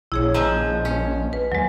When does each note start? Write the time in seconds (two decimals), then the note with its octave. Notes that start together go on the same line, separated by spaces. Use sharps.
0.12 A#1 E4 G#4 C#5
0.34 F3 G#3 A#5 E6
0.85 C#4
1.33 B4
1.52 D#2 F#3 G#3